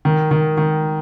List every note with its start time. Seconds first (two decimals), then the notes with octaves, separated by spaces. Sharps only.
0.05 D#3
0.31 D#3
0.58 D#3